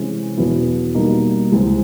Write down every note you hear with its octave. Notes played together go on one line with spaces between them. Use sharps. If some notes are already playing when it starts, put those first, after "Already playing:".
Already playing: C3 E3 G#3 C#4
E2 B2 F#3 B3 E4
B2 G3 A#3 D#4
C#2 C3 E3 G#3 C4